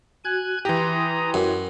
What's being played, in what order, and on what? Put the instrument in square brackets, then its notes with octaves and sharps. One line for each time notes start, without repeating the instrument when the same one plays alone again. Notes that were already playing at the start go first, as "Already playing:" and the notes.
[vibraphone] F#4 [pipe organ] G#5 F#6 G#6
[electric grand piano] E3 G4 [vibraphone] E4 G5 C6 [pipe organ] A#5 D#6
[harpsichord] F#2